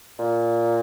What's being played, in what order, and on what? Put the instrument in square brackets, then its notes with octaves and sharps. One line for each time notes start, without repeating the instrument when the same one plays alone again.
[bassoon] A#2